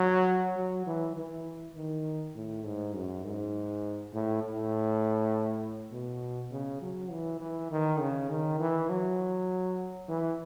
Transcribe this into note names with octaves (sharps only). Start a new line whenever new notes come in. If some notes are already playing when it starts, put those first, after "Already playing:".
Already playing: F#3
F#3
E3
E3
D#3
A2
G#2
F#2
G#2
A2
A2
B2
C#3
F#3
E3
E3
D#3
C#3
D#3
E3
F#3
E3